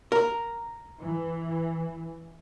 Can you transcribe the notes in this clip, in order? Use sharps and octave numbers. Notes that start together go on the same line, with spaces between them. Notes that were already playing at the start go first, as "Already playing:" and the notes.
A#4
E3